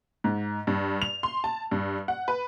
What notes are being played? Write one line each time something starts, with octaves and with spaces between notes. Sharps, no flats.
G#2
G2
F7
C6
A5
G2
F#5
B4